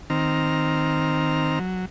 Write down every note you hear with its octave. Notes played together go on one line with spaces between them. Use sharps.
D#3 C4 A#5 F6
F#3